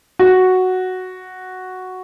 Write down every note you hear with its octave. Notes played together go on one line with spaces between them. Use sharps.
F#4